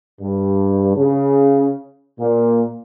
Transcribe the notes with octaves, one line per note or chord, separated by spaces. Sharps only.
G2
C#3
A#2